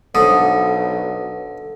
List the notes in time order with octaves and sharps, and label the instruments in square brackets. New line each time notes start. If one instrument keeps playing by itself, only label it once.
[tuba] B1 [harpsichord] D3 [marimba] C5 D#6